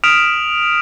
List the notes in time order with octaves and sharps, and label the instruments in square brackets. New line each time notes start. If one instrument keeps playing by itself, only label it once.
[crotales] D#6 F6 B6 D7 E7 F7